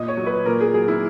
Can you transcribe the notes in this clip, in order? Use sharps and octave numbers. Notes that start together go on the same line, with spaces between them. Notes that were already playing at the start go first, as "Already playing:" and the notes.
Already playing: A#2 D#5
C#5
F#3
B4
A#2 A#4
G#4
F#3 G#4
E4